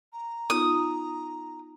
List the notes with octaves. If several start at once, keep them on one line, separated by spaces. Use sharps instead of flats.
A#5
B3 D#4 F4 D#6